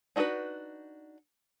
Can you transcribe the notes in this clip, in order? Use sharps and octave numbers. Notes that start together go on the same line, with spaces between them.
D4 D#4 F#4 G#4 B4